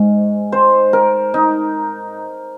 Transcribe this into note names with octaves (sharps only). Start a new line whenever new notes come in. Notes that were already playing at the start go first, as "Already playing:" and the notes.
Already playing: G#2 G#3 C5
C5
A#4
D#4